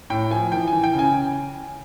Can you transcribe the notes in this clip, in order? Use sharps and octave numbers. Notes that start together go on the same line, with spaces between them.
A2 G5
F3 G#5
E3 G5
G#5
E3
G5
C#3
G#5